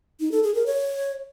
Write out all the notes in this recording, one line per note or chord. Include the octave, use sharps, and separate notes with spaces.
D#4
A4
G#4
A#4
C#5